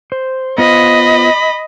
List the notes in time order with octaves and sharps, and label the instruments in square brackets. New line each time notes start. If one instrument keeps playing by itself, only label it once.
[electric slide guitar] C5
[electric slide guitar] B3 F4 C5 [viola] D#5 [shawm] B5